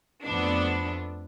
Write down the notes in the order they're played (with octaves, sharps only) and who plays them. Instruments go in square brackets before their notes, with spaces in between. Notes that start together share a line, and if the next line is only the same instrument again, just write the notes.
[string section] F2 F3 A3 B3 D4